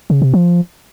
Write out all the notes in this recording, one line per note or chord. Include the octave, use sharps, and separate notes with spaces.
C#3
C3
F3